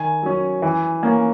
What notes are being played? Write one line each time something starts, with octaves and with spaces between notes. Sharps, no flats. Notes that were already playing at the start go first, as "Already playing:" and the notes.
Already playing: D#3 G#5
F#3 C#4
E3
A#3 C#4